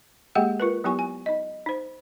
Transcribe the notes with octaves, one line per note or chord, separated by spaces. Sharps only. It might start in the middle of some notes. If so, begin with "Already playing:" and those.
G#3 A#3 G4 G#4 F#5 G5
F4 A#4 B4
F#3 B3 E4 G4 G#5 C#6
G#5
D#4 D#5
D#4 C5